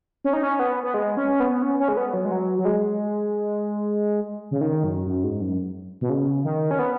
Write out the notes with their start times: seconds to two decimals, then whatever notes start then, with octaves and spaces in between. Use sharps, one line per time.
0.24 C#4
0.33 D#4
0.43 C#4
0.59 B3
0.83 B3
0.94 G#3
1.17 C#4
1.40 B3
1.62 C#4
1.80 C#4
1.88 G#3
1.97 B3
2.14 F#3
2.25 G#3
2.32 F#3
2.59 F#3
2.65 G#3
4.51 C#3
4.61 D#3
4.84 F#2
5.06 F#2
5.24 G#2
5.41 F#2
6.01 B2
6.10 C#3
6.44 D#3
6.71 C#4
6.79 B3